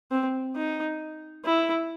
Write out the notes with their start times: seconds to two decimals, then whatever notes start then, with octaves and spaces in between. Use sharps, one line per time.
0.11 C4
0.56 D#4
1.44 E4